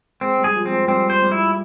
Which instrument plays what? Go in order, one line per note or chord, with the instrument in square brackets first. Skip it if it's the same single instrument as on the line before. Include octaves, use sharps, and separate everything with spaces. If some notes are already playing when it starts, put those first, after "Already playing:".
[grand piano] G#3 [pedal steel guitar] C4
[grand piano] G3
[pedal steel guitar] G#4
[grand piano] F3
[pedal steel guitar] C4
[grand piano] G#3
[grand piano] G3 [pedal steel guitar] C4
[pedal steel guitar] C5
[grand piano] G3
[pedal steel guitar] E4